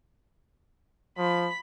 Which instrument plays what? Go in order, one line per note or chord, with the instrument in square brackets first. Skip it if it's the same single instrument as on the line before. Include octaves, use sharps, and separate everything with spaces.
[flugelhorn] F3 [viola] B5